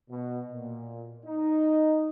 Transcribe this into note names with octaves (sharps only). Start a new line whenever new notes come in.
B2
A#2
D#4